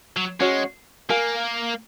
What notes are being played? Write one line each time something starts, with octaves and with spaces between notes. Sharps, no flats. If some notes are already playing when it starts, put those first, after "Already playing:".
F#3
G#3 C#4 F#4 C#5
A#3 A#4 F5 G#5